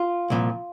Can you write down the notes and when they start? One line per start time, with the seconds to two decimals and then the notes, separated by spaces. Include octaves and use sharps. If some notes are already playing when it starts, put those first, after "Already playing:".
Already playing: F4
0.30 C2 A#2 F3